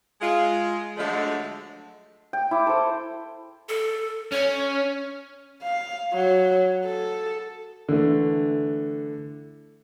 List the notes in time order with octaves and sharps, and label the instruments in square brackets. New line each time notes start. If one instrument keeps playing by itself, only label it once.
[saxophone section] G#3 F4
D3 F3 F#3 G#3 A3 A4
[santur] G5
E4 D6
A4 C5
[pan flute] A4
[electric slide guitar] C#4 [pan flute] C#5
[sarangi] F5
F#3
A4
[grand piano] D3 E3 A3